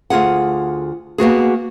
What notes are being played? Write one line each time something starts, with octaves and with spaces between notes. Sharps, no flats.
D2 F4 G#4 F#5
A#3 B3 F#4 G#4